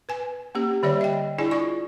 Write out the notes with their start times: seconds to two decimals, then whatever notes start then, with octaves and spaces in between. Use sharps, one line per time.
0.09 B4 G#5
0.55 A#3 C#4 G4
0.83 D3 G3 G4 C#5 D5 E5
1.01 D#5 G5
1.38 D4 E4 G#4 D5 G#5
1.51 F4 D5 C#6